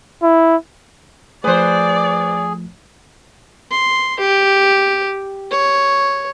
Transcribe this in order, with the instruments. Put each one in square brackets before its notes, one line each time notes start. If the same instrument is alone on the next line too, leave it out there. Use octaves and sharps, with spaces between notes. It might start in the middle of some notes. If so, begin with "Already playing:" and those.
[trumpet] E4
[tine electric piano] F3 A3 [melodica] G#4 [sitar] B4 C5 [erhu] D5
[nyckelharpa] C6
G4
C#5